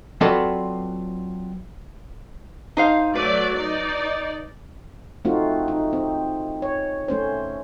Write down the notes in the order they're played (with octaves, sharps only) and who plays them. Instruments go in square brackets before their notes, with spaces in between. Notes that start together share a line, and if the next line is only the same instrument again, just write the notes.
[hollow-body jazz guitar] F#3 C4 F4 A4 B4 D5
[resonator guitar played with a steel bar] D#4 C5 F5
[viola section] F#3 A3 D5 [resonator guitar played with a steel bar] B4
[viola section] D#4 D5
[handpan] A3 C4 D#4 F4 F#4
D#4
C4
C#5
A3 C#4 C5